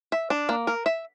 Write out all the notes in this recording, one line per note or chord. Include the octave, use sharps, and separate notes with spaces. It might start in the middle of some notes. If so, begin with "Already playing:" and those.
E5
D4
A#3
A#4
E5